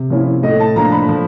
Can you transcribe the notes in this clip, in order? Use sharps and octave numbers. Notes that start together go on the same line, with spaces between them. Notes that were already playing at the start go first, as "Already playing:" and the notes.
Already playing: C3
F3 A#3 C#4 E4
A2 D#5
A5
F3 A#3 D4 A#5
B5
F3